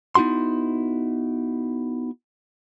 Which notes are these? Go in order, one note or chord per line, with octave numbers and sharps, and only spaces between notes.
B3 D#4 E4 F#4 C6